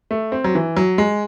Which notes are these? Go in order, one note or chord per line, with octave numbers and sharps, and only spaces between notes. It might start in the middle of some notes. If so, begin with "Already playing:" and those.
A3
C4
F#3
E3
F#3
G#3